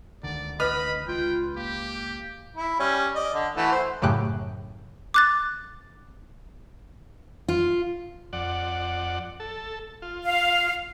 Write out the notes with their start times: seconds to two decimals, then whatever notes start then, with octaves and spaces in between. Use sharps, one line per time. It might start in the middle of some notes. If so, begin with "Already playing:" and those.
0.23 C#2 D3 D#3 D5
0.60 B4 D#5 B5 F6
1.08 C#2 F4 G5
1.56 A#3 G4
2.56 E4
2.80 G3 C#4
3.15 D5 D#5
3.34 D3
3.57 E3 A3 F#4
3.72 C5
4.02 F#2 A2 C#3 A3 G4 F#6
5.14 D6 F#6 A6
7.48 F4
8.33 F2 D5 F#5
9.40 A4
10.02 F4
10.24 F5